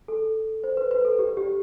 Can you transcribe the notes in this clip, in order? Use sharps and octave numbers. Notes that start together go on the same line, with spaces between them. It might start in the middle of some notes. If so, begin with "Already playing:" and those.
A4
C5
B4
B4
A4
G4
G4